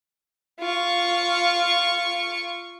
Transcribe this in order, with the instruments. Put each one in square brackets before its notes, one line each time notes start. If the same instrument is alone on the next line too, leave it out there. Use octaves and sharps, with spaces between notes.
[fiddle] F4 C#6